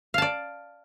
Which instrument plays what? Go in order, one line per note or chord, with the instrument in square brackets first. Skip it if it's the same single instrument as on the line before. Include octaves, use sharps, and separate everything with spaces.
[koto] F5
A5
D5